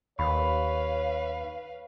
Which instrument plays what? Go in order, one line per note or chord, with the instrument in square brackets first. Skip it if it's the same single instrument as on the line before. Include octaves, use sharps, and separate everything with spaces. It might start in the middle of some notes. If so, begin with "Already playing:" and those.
[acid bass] D#2 [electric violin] B4 F5 [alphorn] C#5 [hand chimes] B5 C#6